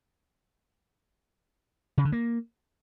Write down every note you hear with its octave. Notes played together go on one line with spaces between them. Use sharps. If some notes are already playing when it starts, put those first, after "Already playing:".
C#3
D3
A#3